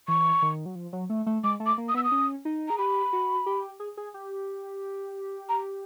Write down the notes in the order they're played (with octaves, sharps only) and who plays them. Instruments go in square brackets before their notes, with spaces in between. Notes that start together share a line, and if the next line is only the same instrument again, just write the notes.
[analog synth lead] E3 [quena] C#6
[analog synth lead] D#3
F#3
F3
F#3
A3
A3
[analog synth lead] G#3 [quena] D6
[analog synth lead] A3
[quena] D6
[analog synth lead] A#3
[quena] D#6
[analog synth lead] B3 [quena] E6
[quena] D#6
[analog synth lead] C#4
D#4
[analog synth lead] G#4 [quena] A#5
[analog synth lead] G4 [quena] B5
[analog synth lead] F#4
G4
G#4
G#4
G4
[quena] A#5